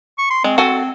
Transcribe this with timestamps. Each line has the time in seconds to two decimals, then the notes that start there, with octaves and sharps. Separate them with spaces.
0.18 C#6
0.31 C6
0.44 G#3 C4
0.58 F#4 A4 G#5